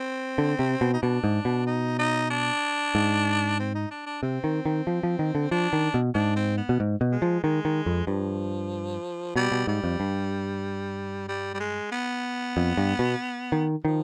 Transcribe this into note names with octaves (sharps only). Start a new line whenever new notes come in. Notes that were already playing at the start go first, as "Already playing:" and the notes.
Already playing: C4
D3
C3
B2
D#4
B2 D4
G#2
B2
D#4
D#4
D4
G#2
C4
D#4
D4
D4
C3 C4
D#3
D#3
F3
F3
D#3
D3
F3 D4
D#3
B2
G#2 D4
C4
B3
B2
G#2
B2
G#3
F3
D#3 G#3
D#3
F2
G2 F3
B2 G3
B2
G#2 G3
F2
G2
G3
G3
G#3
B3
F2
G2
B2
D#3
D#3 F3